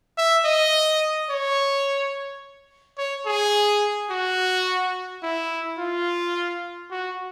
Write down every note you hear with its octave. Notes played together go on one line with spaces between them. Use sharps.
E5
D#5
C#5
C#5
G#4
F#4
E4
F4
F#4